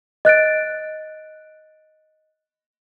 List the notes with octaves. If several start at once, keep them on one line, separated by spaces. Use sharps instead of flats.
D#5 F#6 A6 D7